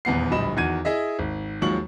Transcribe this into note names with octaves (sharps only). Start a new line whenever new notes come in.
D#1 E2 B3 C7
D1 A#1 G3 D#5 B5 E7
E2 D#3 F#4 G#6 D#7
E4 G#4 D#5 E5
G#1
D#2 F3 F#3 G#3 C#6 F#7